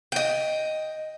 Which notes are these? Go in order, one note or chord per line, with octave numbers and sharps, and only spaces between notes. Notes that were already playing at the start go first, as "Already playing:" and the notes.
D#5 G5